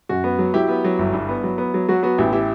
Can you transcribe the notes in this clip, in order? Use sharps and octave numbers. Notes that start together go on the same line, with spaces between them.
F#2 F#4
B3
F#3
F#3 E4 G4
B3
F#3
G1 E4
G2
B3
F#3
B3
F#3
F#3 F#4
B3 F#4
A1 E4 G4
E4 G4